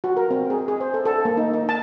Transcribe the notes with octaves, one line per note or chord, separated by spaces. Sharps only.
F#4
A#4
C4
G#4
G#4
C5
A4
A4
A#3
D#4
D#4
A5